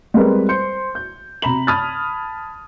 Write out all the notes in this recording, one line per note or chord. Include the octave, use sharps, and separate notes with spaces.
G3 G#3 C4 A#4 B4
C5 C6 G6 C#7
G6
C3 A#5 B5 F#7
A5 B5 D#6 F6 G#6 A6